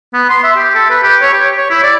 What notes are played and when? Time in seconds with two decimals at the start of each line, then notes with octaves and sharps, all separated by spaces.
0.14 B3
0.30 C6
0.44 E5
0.56 G4
0.75 A4
0.90 B4
1.03 G4
1.22 C#5
1.34 G4
1.57 C#5
1.70 E4
1.83 D5